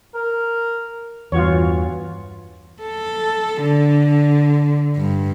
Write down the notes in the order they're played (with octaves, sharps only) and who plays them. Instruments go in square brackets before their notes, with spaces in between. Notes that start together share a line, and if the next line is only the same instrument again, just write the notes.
[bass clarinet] A#4
[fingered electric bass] E2 G2 [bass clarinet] E3 [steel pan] F4 F#4 C#5
[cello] A4
D3
G2